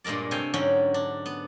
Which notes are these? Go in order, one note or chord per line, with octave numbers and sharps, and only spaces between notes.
G2 A#2 G#3 A#4 D5
C3 A3 F5 G5 G#5
G#2 D3 F#3 C#4 G5
D4
B3